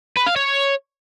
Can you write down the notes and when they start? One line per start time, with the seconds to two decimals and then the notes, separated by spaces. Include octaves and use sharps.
0.17 B4
0.26 F5
0.36 C#5